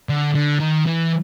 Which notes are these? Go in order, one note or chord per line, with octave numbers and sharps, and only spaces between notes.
D3
D3
D#3
E3